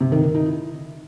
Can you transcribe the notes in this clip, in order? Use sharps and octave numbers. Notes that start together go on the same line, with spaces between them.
C3
D#3
D#3
D#4
E4